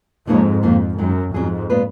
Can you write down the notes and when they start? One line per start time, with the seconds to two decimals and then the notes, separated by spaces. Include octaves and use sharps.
0.27 F2 G#2 F3 A#3 D#4 A#4 C#5
0.62 F2 D#3 A#3 F4
0.98 F#2 D#3 G#3 D#4
1.34 F2 G#2 F#3 C#4 G#4
1.70 A#2 G#3 B3 F4 B4